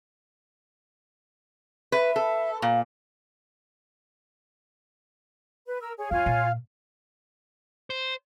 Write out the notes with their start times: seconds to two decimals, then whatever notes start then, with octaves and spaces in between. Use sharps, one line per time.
1.92 B4 E5
2.16 A4
2.62 A#2 F5
5.67 B4
5.80 A#4 E6
5.98 G#4 C#5
6.11 F2 F4 C#5 F5 G#5
6.26 A#2
7.90 C5